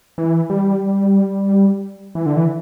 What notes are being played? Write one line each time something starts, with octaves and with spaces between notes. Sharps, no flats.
E3
G3
E3
D3
E3